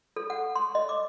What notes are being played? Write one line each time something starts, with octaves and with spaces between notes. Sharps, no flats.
A4
F#5
C6
D#5
D6